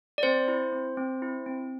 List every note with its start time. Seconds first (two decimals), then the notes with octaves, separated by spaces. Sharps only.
0.18 D5
0.23 C4 C5
0.48 E4
0.73 C4
0.97 C4
1.22 E4
1.46 C4